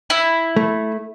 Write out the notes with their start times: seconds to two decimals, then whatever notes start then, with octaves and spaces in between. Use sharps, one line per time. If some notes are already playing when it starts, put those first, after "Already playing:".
0.10 E4
0.56 A3